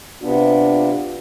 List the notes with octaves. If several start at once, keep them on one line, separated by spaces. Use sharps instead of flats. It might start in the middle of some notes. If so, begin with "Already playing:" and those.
C3 B3 D4 F4